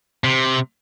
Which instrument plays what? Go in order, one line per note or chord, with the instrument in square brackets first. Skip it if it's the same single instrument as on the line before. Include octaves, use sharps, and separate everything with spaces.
[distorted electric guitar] C3